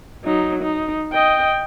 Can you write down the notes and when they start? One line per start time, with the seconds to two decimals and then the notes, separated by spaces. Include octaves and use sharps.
0.24 F#3 D#4
0.62 D#4
1.12 D#5 G5